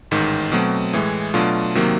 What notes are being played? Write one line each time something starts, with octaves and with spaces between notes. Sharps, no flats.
A1 G#2 D#3
B2 F#3 A3 C4
A2 E3 G#3
B2 F#3 A3 D4 F4
C3 D#3 F#3 A#3